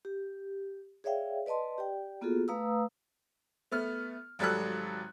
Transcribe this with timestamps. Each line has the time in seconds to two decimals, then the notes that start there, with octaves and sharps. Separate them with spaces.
0.05 G4
1.04 G#4 C#5 D5 E5 F5 G5
1.46 B4 D5 D#5 A5 C6
1.78 G4 D5 G5
2.21 A#3 B3 F4 F#4 G#4 A4
2.48 A3 B4 F5 A#5 D#6 E6
3.71 A3 B3 F6
4.39 G#1 F#3 G3 A4 E6 F#6